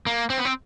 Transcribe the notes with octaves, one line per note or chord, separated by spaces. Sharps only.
A#3
C4
B3
C4